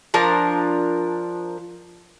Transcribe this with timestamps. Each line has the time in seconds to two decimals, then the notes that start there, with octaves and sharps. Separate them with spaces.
0.14 F3 D4 A#4